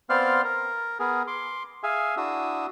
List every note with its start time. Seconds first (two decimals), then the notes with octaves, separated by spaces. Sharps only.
0.10 B3 C4 C5 D5 F5 F6
0.44 A#4
1.00 B3 G#4 A#4
1.27 C6 D6
1.83 G#4 E5 F5 G#5
2.17 D4 E4 F#4 D#6 E6